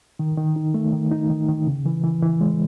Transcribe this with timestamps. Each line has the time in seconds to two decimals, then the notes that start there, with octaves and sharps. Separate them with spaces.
0.19 D#3
0.38 D#3
0.56 D#4
0.74 A3
0.92 D#3
1.11 D#4
1.30 D#3
1.49 D#3
1.67 C#3
1.86 E3
2.03 E3
2.22 E3
2.41 G#3